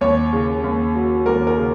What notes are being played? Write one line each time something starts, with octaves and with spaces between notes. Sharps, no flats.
D#2 C#5
C#3
D#2
F#3
D#2 A#4
A#4
C#3